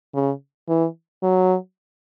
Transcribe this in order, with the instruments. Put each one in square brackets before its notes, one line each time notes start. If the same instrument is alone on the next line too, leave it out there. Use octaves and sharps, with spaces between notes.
[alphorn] C#3
E3
F#3